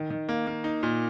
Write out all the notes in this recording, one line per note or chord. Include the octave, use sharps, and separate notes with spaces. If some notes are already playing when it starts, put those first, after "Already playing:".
Already playing: D#3
D#3
A#3
A#3
D#4
A#2